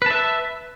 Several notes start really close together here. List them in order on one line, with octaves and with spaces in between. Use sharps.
B4 A5 E5